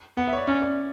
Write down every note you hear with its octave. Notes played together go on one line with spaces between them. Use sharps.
B3 F#5
E5
C#5
D5
C#4 D5
D5